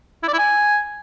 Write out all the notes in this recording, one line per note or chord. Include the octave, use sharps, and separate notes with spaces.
E4
D5
E4
G#5